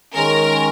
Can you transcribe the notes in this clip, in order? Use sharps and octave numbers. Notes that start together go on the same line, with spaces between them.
D#3 G#3 C#4 A#4